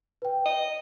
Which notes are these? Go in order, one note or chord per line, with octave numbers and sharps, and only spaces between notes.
B4 G5
D#5